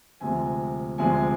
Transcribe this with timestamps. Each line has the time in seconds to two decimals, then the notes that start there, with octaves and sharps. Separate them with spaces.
0.20 D2 C3 F3 G#3 G#5
0.98 D2 C3 F3 G#3 G#5